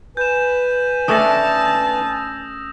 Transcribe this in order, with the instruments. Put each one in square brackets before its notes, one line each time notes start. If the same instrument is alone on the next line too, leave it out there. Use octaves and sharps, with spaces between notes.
[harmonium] B4 G#5 [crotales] G6 E7
[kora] A3 C#4 D4 [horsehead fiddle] A5 [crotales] D#6 E6 A#6